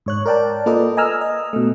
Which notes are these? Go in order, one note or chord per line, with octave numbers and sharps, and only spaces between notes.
G#2 C#5 F#6
A#4 D5 G5 A5
A#3 F4 A4 B4 D5 D#5
D#5 G#5 A#5 E6 F6
D#5
B2 A3